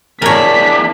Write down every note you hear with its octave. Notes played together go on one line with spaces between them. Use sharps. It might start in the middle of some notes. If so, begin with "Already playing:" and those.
E2 D4 A#4 C#5 B6